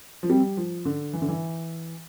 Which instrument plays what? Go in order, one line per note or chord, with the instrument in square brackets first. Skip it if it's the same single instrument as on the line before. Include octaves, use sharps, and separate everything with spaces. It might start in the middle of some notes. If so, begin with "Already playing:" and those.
[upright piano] F3
[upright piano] G3 [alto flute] C4
[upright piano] F3
D3
E3
D3
E3